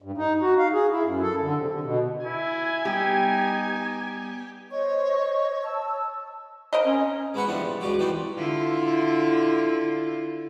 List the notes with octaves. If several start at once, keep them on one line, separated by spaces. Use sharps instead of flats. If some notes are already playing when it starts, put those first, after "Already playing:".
G2
D#4
F#4
F5
G#4
E4
F#2
A4
D3
C3
D3
B2
E4 G#5
G3 B3 D#4 G4
C5 C#5 D#5 C#6
A5 E6
A#4 C5 D#5
C#4
G#3 B3 F#4 B4 F#5
F3 G3 B3 C4 D4 E4
C#3
C#2 F#2 G#3 F4 F#4 D6
E3 F#3 G3 C4 D#4 G4
D3 E4 F4